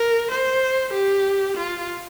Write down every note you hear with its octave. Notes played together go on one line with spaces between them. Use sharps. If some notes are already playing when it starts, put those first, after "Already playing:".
Already playing: A#4
C5
G4
F4